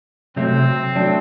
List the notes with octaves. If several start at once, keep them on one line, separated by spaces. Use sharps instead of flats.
C3 F#3 A3 C4
F#3 A3 D4